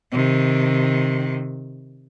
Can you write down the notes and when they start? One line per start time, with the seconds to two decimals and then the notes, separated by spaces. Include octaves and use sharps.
0.12 C3 D#3